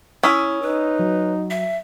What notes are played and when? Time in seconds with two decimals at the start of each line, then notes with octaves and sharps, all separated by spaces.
0.23 C#4 E4 D#6 E6 B6
0.62 D#4 B4
0.99 F#3
1.51 E5